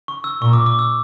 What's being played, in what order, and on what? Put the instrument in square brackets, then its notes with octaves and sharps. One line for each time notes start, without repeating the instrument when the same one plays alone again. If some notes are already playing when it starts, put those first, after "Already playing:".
[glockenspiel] C#6
E6
[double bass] A#2 [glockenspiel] C#6
[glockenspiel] D6
D6
E6